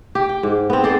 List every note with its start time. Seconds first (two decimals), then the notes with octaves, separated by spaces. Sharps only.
0.15 G4
0.29 G5
0.43 G#2
0.70 B3 C4
0.83 G#4 A4 C5 D5